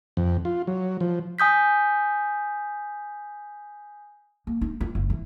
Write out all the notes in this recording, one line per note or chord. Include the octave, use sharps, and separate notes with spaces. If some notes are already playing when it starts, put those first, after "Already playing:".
F2
F4
F#3
F3
G#5 D#6 G6 B6
A#3
D#4
F4
F#1
E3